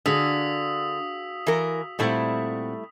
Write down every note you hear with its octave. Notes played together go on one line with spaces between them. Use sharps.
D3 F#4 G#4 F5 D#6 E6 B6
E3 A#4
A#2 G3 A3 C4 E4 F#5